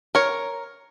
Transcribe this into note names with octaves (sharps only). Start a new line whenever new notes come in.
A#4 C#5